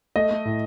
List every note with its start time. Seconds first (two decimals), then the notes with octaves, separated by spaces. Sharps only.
0.16 A3 D#5
0.31 A3
0.45 A2